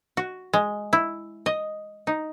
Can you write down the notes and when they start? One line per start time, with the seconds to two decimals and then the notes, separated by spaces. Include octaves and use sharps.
0.17 F#4
0.53 G#3
0.93 E4
1.46 D#5
2.07 D#4